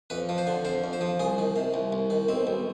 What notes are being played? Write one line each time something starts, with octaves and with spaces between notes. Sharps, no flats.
F2 B4
F3
C5
D3
F2 C5
F2
C5
F3
C2 G#4
D#3
C3
C2
C2
D#3
B1 C4
B1